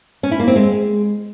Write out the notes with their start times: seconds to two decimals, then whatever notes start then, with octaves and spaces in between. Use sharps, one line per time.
0.23 C#4
0.31 E4
0.39 A#3
0.48 C4
0.56 G#3